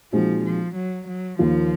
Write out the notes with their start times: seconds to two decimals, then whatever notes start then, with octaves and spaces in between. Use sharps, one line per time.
0.12 A#2 F3 G#3 C4 D#4 F#4
0.44 F3
0.75 F#3
1.07 F#3
1.39 D#2 D#3 F3 A#3 F4